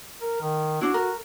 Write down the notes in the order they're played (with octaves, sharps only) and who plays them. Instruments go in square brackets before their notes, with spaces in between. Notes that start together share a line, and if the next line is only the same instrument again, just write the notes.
[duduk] A#4
D#3
[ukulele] D4 E4 [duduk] F#4
[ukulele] A#4